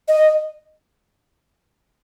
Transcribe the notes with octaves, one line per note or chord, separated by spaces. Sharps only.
D#5